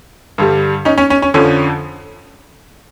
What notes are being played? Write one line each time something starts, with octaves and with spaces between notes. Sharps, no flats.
G2 D3 G3
C#4 D#4
C#4
C#4
C#4
F2 D3 F3 C#4